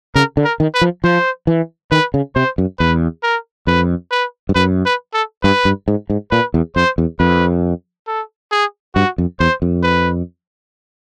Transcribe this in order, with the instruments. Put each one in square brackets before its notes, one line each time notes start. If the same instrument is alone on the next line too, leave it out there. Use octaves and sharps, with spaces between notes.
[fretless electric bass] C#3 [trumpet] A#4
[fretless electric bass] D3
[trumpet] A#4
[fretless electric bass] D#3
[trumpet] B4
[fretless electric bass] F3
[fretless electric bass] F3 [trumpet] C5
[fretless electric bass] E3
[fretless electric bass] D#3 [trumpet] B4
[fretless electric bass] C#3
[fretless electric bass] C3 [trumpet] C5
[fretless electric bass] F#2
[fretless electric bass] E2 [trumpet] B4
[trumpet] A#4
[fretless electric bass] F2 [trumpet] B4
[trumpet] B4
[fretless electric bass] G2
[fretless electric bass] F#2 [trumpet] B4
[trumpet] B4
A4
[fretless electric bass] G2 [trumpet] B4
[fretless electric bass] G2
G#2
G#2
[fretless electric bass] A#2 [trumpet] B4
[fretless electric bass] E2
[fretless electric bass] F2 [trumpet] C5
[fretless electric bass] E2
[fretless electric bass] F2 [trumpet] B4
[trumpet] A4
G#4
[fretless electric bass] G2 [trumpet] F#4
[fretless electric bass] F2
[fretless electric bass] E2 [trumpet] C5
[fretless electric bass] F2
[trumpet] B4